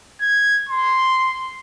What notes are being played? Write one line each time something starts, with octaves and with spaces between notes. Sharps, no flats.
G#6
C6